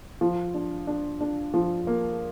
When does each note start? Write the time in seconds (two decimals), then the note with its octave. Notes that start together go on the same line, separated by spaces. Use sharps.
0.21 F3
0.54 D4
0.87 D4
1.21 D4
1.54 F3
1.87 A#3